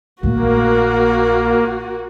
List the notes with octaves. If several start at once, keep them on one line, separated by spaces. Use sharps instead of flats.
A#1 A3 A#3 F#4